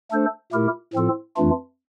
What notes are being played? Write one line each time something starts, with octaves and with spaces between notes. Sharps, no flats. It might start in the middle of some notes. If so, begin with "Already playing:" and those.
A3 D4 A4 C5
A#2 A3 E4 G4 A#4
A2 F3 C4 F4 A4
F2 E3 A3 D4 F4